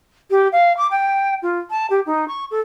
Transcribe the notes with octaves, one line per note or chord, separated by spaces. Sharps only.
G4
F5
D6
G5
F4
A5
G4
D#4
C#6
A4